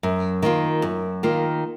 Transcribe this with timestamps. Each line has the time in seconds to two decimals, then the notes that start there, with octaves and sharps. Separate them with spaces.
0.03 F#2
0.42 D#3 A#3 F4
0.82 F#2
1.23 D#3 A#3 F4